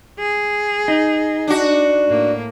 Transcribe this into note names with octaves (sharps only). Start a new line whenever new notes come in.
G#4
D#4
D4 F#4
A2 A#3